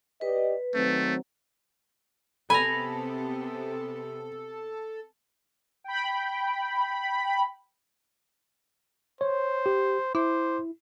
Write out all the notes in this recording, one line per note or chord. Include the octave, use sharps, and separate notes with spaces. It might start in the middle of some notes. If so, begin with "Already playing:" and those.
G4 B4 D5 D#5
D#3 F#3 A3 C4
C3 B3 A4 G#5 A#5 B5
G5 B5
C5 C#5
G4
E4 C5 D6